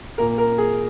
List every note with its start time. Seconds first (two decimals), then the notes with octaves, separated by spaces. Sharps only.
0.18 A#2 A#3 A#4
0.38 A#4
0.58 G#4